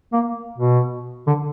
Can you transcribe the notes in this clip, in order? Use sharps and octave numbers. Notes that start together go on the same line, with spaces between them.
A#3
B2
D3